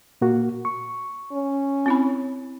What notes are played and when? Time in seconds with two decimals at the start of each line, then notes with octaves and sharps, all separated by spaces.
0.21 A#2 A#3 F#4
0.65 C#6
1.33 C#4
1.86 C4 E4 B5